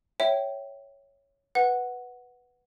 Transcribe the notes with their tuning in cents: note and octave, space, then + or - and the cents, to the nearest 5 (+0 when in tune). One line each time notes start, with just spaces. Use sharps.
C#5 +0 E5 +0 G5 -15
B4 +0 F#5 +0